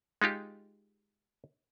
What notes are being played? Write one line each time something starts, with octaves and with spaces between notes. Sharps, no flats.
G#3 D#4 F4 G4